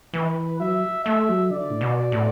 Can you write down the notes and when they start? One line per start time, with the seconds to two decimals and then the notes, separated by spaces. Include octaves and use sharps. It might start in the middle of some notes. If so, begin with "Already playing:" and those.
0.13 E3 B4
0.60 F#3 E5
1.05 A3 E5
1.29 F#3
1.51 D3 D5
1.70 A2
1.81 B2
2.12 A2